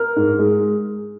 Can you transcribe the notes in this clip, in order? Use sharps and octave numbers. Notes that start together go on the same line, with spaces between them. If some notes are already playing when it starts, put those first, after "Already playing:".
Already playing: A#4
G#2
G#3